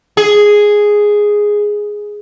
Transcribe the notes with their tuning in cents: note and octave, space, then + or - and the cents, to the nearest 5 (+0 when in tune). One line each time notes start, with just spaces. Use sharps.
G#4 +0